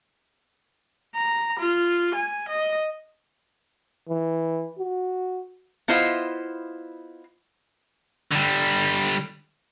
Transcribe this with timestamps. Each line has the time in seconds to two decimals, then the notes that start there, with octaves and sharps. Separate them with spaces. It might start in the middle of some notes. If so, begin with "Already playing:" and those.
1.15 A#5
1.59 F4
2.15 G#5
2.49 D#5
4.09 E3
4.78 F#4
5.88 B3 E4 F4 C5 D#5 E5
8.32 D3 G3